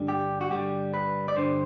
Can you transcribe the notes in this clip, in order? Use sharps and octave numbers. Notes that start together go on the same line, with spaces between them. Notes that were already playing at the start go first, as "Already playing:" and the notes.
Already playing: G2 D3 G3
G4
F#4
G2 D3 G3 G4
B4
D5
G2 D3 G3 C5